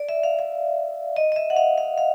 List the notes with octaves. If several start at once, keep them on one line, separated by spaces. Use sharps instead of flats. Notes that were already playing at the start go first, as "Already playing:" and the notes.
Already playing: D5
E5
F5
F5
D#5
D#5
E5
F#5
F5
F5
F5